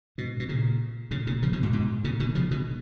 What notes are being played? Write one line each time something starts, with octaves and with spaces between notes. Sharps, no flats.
G#2 B2
B2
A#2 C#3
A#2 C#3
A#2 C#3
C#3 F3
B2 D#3
G#2 B2
G#2 B2
A#2 C#3
B2 D#3
C#3 F3
B2 D#3